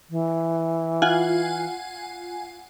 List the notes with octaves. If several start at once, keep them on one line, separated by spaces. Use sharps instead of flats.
E3
F4 F#5 G#5